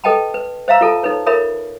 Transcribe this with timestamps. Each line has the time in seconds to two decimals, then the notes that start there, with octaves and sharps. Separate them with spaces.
0.04 A4 B4 D#5 G5 A5 B5
0.34 B4
0.68 C5 E5 F5 A#5 E6
0.81 F4 A4 A5
1.03 D#4 A4 B4 C#5
1.26 F4 A4 A#4 C#5 E5 B5